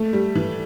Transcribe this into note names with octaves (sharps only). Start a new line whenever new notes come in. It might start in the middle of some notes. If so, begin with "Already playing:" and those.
Already playing: A3
G3
E3